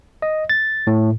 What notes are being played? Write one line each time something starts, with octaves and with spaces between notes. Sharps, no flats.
D#5
A6
A2